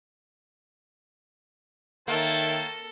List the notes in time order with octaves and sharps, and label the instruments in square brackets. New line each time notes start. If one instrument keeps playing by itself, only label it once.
[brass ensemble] D#3 E5 [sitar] A#3 [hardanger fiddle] A4 [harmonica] C#5 G5 A5